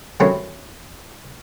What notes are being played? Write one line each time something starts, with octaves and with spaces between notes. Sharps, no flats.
D#3 F#3 A3 C4 C#4 E4